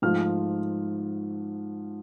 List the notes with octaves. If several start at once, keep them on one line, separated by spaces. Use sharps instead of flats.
G#2 F3 A3 F6